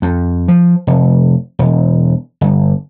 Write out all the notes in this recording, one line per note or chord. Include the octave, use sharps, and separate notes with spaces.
F2
F3
F1
E1
G1